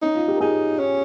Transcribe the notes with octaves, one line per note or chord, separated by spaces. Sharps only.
C#4 D#4
F4
G4
A#4
D#4 G#4
C#4